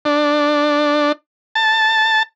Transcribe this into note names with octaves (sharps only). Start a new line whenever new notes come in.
D4
A5